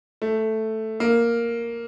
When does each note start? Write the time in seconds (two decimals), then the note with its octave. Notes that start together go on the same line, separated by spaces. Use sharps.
0.22 A3
1.00 A#3